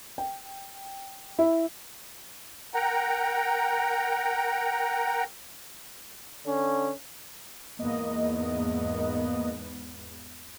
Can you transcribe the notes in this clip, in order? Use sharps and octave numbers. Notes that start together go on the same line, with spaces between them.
G5
E4
A#4 F#5 G5 A#5
D3 C#4
E2 G#2 A#3 B3 D#5